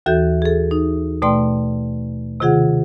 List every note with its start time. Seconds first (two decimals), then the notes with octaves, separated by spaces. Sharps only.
0.06 D#2 E3 F#4 A4 E5 G6
0.42 G#4 A4
0.71 D#4
1.22 B2 A3 D5 G5 C6
2.40 C3 D#3 F4 G#4 F#5